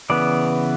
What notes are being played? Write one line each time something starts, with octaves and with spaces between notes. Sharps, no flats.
C#3 E3 B3 D5